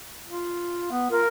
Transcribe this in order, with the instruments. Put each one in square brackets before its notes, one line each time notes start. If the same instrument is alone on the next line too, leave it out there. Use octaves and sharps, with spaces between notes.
[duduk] F4
B3
[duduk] F4 [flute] A#4